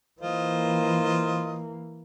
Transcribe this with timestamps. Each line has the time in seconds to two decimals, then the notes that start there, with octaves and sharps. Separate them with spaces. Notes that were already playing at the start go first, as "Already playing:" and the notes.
0.21 E3 A#3 F4 C5 D#5